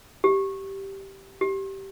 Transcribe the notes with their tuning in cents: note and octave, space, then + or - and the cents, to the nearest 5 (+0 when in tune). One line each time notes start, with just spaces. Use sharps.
G4 -10
G4 -15